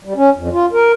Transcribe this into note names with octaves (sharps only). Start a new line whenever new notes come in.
G3
C#4
F2
F4
A#4